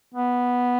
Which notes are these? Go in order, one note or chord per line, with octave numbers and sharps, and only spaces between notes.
B3